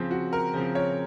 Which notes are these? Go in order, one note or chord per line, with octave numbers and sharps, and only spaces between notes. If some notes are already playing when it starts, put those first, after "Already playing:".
Already playing: C#3 F3 C4
F#4
A#4
C#3 F3 C4 C5
C#5